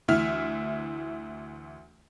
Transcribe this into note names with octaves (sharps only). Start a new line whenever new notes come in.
D2 E3 E5 F6